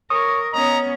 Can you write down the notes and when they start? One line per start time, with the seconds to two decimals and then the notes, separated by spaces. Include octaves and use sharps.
0.10 A#4 C#5 D#6
0.53 B3 C#4 D#5 A#5